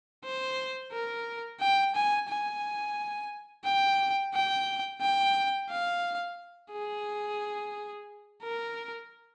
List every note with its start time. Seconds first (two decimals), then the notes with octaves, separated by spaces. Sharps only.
0.24 C5
0.92 A#4
1.60 G5
1.95 G#5
2.29 G#5
3.65 G5
4.34 G5
5.01 G5
5.70 F5
6.72 G#4
8.43 A#4